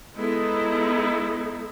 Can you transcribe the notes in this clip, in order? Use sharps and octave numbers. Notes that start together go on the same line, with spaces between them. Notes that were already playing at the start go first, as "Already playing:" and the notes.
G#3 B3 D#4 E4 A4